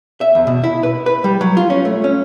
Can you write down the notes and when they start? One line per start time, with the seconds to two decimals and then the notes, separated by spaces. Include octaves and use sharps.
0.21 E5
0.35 E2
0.47 B2
0.64 E4
0.83 B4
1.06 B4
1.24 G3
1.41 F#3
1.57 F4
1.70 C#4
1.85 A3
2.04 C#4